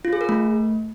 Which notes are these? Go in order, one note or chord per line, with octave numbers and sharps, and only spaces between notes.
F4
G#4
A#4
A3